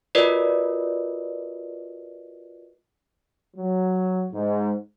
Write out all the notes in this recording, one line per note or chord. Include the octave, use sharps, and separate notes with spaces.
F4 F#4 A#4 B4 D5 D#5
F#3
G#2